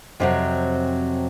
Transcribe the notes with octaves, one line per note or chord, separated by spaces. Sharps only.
F2 C3 D#3 F#3